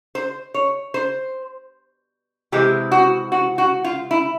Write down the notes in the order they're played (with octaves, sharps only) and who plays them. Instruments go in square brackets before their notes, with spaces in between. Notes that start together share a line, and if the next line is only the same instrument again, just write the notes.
[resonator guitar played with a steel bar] C5
C#5
C5
C3 E3 G#3 C4 G4
F#4
F#4
F#4
F4
E4